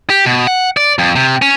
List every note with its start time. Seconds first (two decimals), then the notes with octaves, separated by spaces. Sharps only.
0.10 G4
0.26 B2
0.47 F#5
0.77 D5
0.99 F2
1.16 C3
1.42 C#4